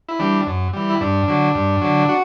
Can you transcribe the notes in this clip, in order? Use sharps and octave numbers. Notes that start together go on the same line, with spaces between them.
E4
E3 G3 D4
F#2
E3 G3
E4
G2 D4
D3 F#3
G2
D3 F#3
F#4